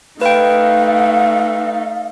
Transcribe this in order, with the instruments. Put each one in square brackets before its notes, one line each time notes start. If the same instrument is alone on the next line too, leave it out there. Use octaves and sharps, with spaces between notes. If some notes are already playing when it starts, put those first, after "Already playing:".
[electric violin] A3 D#4 [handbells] B4 G5 [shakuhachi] F5